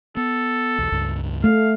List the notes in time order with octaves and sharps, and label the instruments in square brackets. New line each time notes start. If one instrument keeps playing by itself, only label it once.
[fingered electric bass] B3 [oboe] A4
[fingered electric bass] B1 E2
C#2 G2
[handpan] A3 [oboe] F5